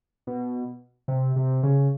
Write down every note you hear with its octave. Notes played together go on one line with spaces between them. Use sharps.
B2
C3
C3
C#3